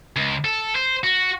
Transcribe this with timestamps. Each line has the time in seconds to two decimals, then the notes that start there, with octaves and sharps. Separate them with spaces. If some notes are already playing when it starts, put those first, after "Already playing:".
0.16 C#2
0.44 A4
0.76 C5
1.04 F#4